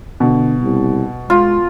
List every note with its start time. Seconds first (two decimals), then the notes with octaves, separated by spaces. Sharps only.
0.20 B2 D3
0.62 C2
1.30 G#3 F4